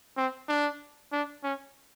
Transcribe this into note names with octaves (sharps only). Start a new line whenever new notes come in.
C4
D4
D4
C#4